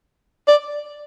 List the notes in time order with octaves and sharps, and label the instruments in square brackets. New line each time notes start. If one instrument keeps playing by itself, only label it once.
[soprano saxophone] D5